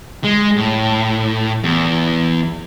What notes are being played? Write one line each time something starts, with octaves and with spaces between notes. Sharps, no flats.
G#3
A2
E2